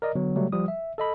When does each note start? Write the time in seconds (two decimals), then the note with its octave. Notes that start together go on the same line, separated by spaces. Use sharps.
0.02 A#4 D5 D#5
0.15 D3 F#3 B3
0.36 C#3 F#3 G3 A3
0.52 F3 G3 D#6
0.68 E5
0.98 A4 D#5 B5